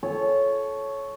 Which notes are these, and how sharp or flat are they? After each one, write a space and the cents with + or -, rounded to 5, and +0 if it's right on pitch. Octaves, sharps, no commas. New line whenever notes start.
A4 -20 C#5 +0